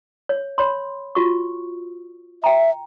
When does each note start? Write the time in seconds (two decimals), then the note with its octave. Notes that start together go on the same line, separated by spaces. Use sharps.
0.29 C#5
0.58 C#5 B5 C6
1.15 F4 F#4 C#6
2.44 E5 G5 A#5